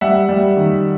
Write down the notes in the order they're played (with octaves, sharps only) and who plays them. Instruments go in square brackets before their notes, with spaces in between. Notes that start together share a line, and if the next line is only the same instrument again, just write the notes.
[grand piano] G3 E5 F#5
G3
D#3